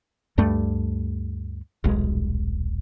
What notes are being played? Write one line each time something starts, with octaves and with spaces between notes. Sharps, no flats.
D2 G2 G3 A3
D#1 B1 G#3